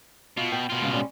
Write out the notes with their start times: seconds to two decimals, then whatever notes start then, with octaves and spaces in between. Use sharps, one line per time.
0.37 B2 F4
0.52 G5
0.70 B2 F4
0.81 C#3 G#3
0.93 G3 G#3 C#4